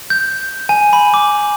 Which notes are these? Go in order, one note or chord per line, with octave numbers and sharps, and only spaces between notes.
G6
G#5
B5
D6